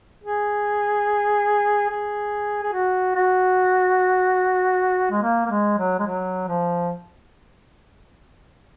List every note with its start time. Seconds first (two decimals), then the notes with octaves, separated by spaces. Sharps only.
0.24 G#4
1.90 G#4
2.63 G#4
2.73 F#4
3.15 F#4
5.11 G#3
5.23 A#3
5.46 A#3
5.50 G#3
5.78 F#3
5.99 G#3
6.06 F#3
6.48 F3